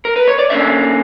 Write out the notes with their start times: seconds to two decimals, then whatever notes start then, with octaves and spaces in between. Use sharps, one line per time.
0.05 A#4
0.16 B4
0.28 C#5
0.39 D5
0.50 D3 A#3 C#4 E5